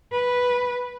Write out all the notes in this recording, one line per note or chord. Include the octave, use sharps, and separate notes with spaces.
B4